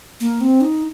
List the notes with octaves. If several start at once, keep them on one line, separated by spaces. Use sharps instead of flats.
A#3
C4
D#4